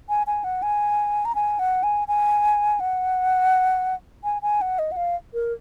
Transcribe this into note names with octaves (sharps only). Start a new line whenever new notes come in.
G#5
G#5
F#5
G#5
A#5
G#5
F#5
G#5
G#5
F#5
G#5
G#5
F#5
D#5
F#5
F5
A#4